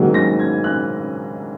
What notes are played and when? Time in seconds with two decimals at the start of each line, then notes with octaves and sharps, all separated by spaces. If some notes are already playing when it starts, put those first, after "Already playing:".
Already playing: G#2 D#3 F#3 A#3
0.14 A#6
0.39 G#6
0.64 F#6